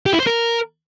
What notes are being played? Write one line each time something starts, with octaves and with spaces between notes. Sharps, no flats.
G4
E4
C5
A#4